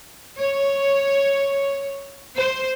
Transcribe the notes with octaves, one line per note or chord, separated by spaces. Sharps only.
C#5
C5